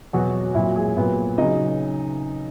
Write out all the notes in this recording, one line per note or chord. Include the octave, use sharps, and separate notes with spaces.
E2 B2 F#3 F#4
A#2 F#3 E4
G#3 G#4
A#2 F#3 B3 B4
C#3 F#3 D#4 D#5